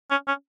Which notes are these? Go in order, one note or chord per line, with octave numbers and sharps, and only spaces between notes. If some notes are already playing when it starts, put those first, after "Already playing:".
C#4
C#4